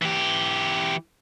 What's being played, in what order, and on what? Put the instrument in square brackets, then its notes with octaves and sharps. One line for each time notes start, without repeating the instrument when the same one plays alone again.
[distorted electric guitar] E3 G4